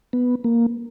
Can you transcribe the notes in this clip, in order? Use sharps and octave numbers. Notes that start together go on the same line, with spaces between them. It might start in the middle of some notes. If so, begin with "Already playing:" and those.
B3
A#3